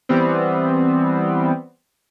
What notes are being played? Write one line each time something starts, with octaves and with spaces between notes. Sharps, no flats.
E3 G3 B3 C4